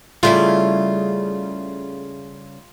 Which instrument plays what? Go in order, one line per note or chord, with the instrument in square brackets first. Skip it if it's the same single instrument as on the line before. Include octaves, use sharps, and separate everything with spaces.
[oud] C#3 G3 E4 [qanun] A3 [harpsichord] F4